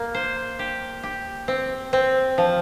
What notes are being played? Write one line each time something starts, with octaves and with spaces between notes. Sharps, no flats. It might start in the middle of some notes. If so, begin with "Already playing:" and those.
Already playing: A#3
C5
G4
G4
C4
C4
F3